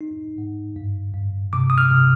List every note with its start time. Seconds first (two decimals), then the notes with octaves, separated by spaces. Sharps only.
0.01 D#4
0.38 G#2
0.76 G2
1.14 G2
1.53 C3 D6
1.70 D#6
1.78 F6
1.91 C3